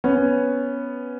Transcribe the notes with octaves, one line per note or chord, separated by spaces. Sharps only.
B3 C#4